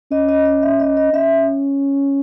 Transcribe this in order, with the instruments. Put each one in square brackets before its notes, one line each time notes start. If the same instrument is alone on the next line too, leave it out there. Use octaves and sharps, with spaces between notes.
[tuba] C#4 [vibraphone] D#5
[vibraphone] D#5
D#5
E5
D#5
D#5
[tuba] C#4 [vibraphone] E5